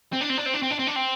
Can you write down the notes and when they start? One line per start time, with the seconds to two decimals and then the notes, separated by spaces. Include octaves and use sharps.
0.13 C4
0.21 D4
0.29 C4
0.38 D4
0.46 C4
0.54 D4
0.62 C4
0.71 D4
0.79 C4
0.87 D4
0.96 C4